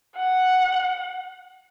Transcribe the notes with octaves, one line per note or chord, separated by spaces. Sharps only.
F#5